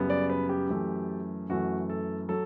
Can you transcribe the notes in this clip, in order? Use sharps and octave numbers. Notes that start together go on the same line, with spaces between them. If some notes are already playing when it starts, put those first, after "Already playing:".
Already playing: F#2 C#3 G3 B3
D5
B4
G4
F#2 E3 A3
F#2 E3 A3 F#4
A4
F#3 A4